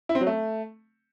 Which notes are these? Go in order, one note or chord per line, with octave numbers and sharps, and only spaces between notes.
E4
C4
F#3
A3